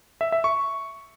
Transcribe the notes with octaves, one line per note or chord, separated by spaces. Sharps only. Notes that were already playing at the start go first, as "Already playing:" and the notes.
E5
E5
C#6